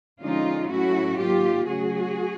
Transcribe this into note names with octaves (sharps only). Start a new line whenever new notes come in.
D3 F3 G#3 C#4 D#4 F4
A2 F#3 A3 C#4 E4 F#4
G#2 D#3 F#3 A#3 F4 G4
C#3 F#3 A3 C#4 F#4 G#4